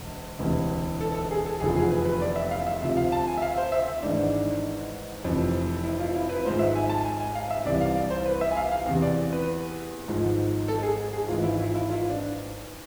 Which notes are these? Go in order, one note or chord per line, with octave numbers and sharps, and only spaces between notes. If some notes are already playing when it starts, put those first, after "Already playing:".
Already playing: E1 D2
E1 D2 C3 E3
A4
A4
G#4
A4
F1 E2 D3 F3 G#4
G#4
B4
B4
D5
E5
F5
E5
D2 C3 F3 E5
F5
A5
G#5
E5
F5
C5
E5
G#1 G#2 E3 D4
F1 F2 E3
E4
F4
E4
B4
G#1 G#2 F3 C5
E5
G#5
A5
G#5
G#5
F5
E5
C2 C3 E3 D5
F5
D5
C5
B4
E5
G#5
F5
F5
E2 C3 E3
D5
B4
G#1 G#2 F3
A4
G#4
G#4
G#1 G#2 E3 F4
E4
F4
E4
F4
D4